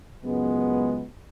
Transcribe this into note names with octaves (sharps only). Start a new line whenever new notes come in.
C#2 F#2 G#3 B3